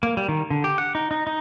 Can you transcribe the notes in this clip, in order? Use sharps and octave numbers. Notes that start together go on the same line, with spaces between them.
A#3
G3
D#3
D3
G4
F#5
D#4
D#4
D#4